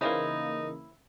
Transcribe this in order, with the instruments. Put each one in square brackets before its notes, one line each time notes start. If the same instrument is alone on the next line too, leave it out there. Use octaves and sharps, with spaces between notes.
[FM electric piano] C#3 E3 A#3 [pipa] C4 C#4 E4 [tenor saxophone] D#4